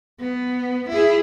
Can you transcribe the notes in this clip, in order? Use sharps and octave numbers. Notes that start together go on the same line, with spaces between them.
B3
E4 G#4